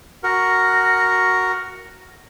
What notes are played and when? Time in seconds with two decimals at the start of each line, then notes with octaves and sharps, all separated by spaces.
0.23 F#4 A#4